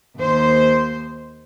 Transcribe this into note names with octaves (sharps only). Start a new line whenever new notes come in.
D#2 C5